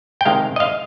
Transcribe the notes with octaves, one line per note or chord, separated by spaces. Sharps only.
G5
C3 D#3 G#3 F5
D#5
F5